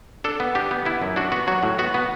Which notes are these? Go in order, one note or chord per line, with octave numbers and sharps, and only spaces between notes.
D4 A4
B3
D4 G4
B3
B3 E4
F#2
D4 F#4
B3 F#4
F#3 F#4
A2
B3 F#4
B3